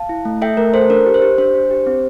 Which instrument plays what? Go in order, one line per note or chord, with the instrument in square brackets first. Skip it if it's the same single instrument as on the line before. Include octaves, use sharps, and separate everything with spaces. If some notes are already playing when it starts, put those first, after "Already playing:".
Already playing: [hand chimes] F5 A5
E4
A3
A4 E5 G5
A3 A#4
A4 C5
D4 A#4
G4
C5
G4
D4 C5
D4
G4
C4